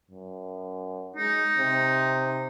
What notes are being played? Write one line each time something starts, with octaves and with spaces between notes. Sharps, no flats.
F#2
G#3 D#4
C3